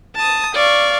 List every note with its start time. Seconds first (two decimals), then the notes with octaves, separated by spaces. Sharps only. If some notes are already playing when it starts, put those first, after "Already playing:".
0.16 A5 D#6
0.55 D5 F5 C#6